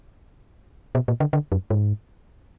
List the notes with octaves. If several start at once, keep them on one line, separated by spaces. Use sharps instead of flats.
B2
A#2
D3
D3
F#2
G#2